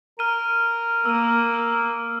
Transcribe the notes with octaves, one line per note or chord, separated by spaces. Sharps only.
A#4 F6 D#7
A#3 E6 D#7